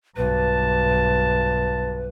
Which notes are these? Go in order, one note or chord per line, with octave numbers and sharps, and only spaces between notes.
B1 G2 B4 A5